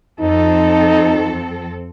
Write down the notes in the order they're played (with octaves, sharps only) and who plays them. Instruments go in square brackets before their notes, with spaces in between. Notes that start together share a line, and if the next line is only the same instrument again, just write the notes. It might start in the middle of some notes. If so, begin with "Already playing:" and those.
[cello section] F2 C4 A4 [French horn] D#4